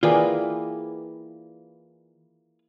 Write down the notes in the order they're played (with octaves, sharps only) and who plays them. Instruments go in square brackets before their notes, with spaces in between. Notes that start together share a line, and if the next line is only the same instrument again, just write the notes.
[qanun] E3 A#3 [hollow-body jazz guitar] F4 G#4 B4 [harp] D5 G5 D#6